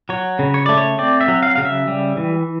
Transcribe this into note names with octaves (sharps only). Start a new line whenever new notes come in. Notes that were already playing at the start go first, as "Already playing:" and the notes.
F#3 C#5
C#3
C#5
A3 D5
C#5
C4 D5
E5
F#3
F5
C#3 F5
E5
G3
E3